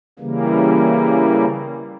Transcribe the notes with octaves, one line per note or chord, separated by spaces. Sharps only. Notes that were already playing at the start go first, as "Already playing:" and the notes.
C#3 E3 G3 A#3